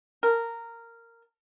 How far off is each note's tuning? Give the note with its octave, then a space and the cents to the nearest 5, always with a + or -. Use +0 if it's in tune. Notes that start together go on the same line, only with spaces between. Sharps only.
A#4 -10